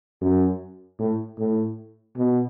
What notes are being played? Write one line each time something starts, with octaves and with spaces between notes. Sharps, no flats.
F#2
A2
A2
B2